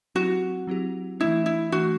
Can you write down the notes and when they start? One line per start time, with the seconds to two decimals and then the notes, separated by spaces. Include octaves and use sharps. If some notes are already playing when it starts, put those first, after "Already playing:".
0.15 F#3 C4 E4 F#4 G4
0.67 F#3 C4 E4 G4
1.20 E3 A3 D4 E4
1.46 E4
1.72 E3 A3 D4 F#4